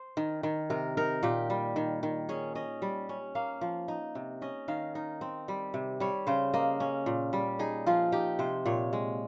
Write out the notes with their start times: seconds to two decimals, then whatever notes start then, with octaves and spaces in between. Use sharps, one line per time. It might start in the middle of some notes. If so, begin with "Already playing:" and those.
Already playing: C5
0.17 D#3
0.43 D#3
0.70 C3 A#4
0.97 D#4 A#4
1.23 A#2 G4
1.50 G3
1.76 D#3
2.03 D#3
2.29 C#4 G#4
2.55 C#4 D#5
2.82 G3
3.09 C#4
3.35 A#3 F5
3.61 F3
3.88 D#4
4.15 C3
4.42 C#4 D#5
4.68 D#3 F5
4.95 D#4
5.21 C4
5.48 G3
5.74 C3
6.00 G3 C#5
6.27 C#3 C5
6.54 A#3 D#5
6.80 C#4
7.06 A#2
7.33 G3
7.59 D#4 G#4
7.87 F3 F4
8.12 D#4 G4
8.39 C3 C5
8.66 A#2 C#5
8.93 G#3